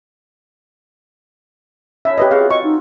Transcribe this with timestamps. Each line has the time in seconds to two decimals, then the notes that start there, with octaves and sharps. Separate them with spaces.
2.05 C#3 E4 A4 E5
2.18 G4 B4 D#5
2.31 C4 F4 F#4 G#4 F5
2.51 D#5 C#6
2.64 D#4